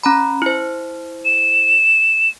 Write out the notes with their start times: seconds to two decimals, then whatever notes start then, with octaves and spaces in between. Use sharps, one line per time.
0.03 C#4 A#5 B5
0.42 E4 C5
1.25 E7